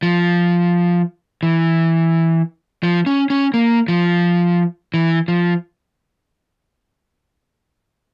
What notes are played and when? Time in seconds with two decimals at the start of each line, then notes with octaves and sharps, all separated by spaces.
0.03 F3
1.43 E3
2.83 F3
3.06 C#4
3.30 C#4
3.54 A#3
3.88 F3
4.94 E3
5.28 F3